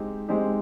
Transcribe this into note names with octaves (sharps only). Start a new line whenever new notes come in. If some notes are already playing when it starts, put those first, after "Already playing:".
Already playing: G#3 C4 D#4 G4
G#3 C4 D#4 G4